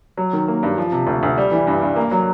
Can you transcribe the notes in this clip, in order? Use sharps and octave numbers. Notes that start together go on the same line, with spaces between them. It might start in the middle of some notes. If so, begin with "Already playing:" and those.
F#3
D#3
A#3
G2
F3
C3
D2
D2
G3
E3
G2
G2
A#3
F#3